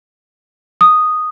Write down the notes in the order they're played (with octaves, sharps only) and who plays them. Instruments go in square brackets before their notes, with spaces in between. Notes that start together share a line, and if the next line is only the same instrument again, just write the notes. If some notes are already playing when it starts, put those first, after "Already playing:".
[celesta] D#6